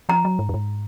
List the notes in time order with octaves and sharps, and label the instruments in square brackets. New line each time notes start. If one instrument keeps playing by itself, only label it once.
[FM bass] F3 [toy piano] A#5
[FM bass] F#3
G#2
F#2
G#2